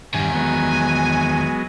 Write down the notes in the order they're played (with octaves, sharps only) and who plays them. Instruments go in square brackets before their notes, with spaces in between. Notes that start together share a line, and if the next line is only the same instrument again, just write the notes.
[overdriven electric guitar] E2 D#3 [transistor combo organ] G2 [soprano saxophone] G#5
[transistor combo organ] F#3 G#3 B3